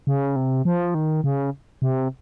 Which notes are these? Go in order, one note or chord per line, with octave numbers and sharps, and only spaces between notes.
C#3
C3
F3
D#3
C#3
C3